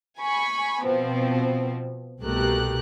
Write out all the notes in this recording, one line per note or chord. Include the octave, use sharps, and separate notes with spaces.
G#5 B5 C#6
B2 F3 B3 C4
C2 B2 A3 G4 A#4 F#6